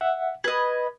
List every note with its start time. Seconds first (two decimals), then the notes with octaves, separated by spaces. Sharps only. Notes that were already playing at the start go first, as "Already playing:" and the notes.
0.01 E5 F#5
0.44 B4 D#5 G#6